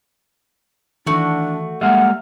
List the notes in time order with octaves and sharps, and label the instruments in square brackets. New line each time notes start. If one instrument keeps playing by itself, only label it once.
[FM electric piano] D#3 E3 [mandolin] A3 F#4 [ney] D4
[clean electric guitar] G3 G#3 A#3 [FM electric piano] E5 F6 [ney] F#5